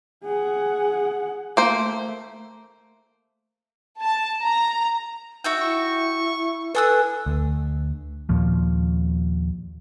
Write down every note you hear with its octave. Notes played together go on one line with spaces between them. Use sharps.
G#4 F#5
A3 A#3 C5
A5
A#5
D#4 F#4 E5 G5
E4 C#6
D4 A4 B4 G#5 D#6 E6 F#6
D2
D#2 A#2 F3